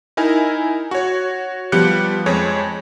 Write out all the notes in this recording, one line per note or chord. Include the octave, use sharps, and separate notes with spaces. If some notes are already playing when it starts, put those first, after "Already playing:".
D#4 E4 A#4 G#5
F#4 C#5
F3 G3 B3 G4 F#6 C#7
F2 G#3 C#5